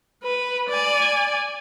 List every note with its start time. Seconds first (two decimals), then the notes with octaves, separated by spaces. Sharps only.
0.24 B4
0.69 D5 G#5